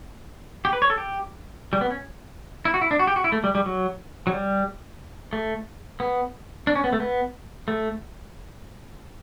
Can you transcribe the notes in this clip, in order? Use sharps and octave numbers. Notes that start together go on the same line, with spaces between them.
G4
B4
C#5
A4
G4
G3
B3
C#4
E4
F#4
E4
D4
F#4
G4
F#4
E4
A3
G3
G3
F#3
F#3
G3
A3
B3
D4
C#4
B3
A3
B3
A3